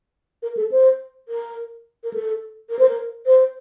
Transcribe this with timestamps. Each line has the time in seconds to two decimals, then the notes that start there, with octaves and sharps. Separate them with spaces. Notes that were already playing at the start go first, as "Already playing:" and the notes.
0.43 A#4
0.57 A4
0.71 C5
1.29 A#4
2.04 A#4
2.14 A4
2.70 A#4
2.79 C5
2.89 A#4
3.26 C5